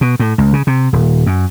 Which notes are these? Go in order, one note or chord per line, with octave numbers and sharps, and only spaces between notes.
B2
A2
C#2
C#3
C3
D#1
F#2